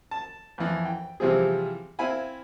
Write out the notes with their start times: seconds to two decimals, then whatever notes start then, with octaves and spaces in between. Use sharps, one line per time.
0.11 A5
0.58 F2 E3
0.85 G5
1.20 C3 E3 F3 G3 C4 G#4
1.99 C4 E4 E5 F5 G#5 B5